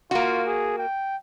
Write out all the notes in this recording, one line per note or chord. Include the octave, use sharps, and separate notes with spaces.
A#3 F4 F#4
G#4
G5